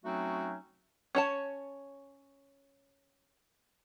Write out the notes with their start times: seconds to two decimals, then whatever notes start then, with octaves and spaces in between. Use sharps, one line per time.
0.05 F#3 A3 C4 C#4 D#4 F#4
1.15 C#4 C#5 A5